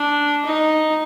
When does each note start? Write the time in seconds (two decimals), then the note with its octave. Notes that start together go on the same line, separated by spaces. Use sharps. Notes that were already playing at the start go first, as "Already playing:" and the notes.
Already playing: D4
0.45 D#4